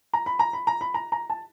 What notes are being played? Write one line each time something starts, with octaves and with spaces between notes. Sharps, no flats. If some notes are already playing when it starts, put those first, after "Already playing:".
A#5
B5
A#5
B5
A#5
B5
A#5
A#5
A5